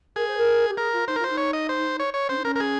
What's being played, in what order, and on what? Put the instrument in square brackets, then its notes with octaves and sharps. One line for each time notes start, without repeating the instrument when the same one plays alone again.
[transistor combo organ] G#4 [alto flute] A#4
[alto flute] C5
A#4
G4
[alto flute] G#4 [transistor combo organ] A#4
[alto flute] F4
[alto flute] D#4 [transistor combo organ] C5
[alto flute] F4 [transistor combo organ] A#4
[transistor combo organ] C5
[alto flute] D#4
[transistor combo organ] C#5
D#5
C5
C#5
C#5
[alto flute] C#4 [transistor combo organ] C5
[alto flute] D#4
[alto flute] C#4 [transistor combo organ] A#4
[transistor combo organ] A#4
G#4